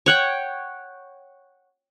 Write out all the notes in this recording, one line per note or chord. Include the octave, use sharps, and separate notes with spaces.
C#5 F#5 G5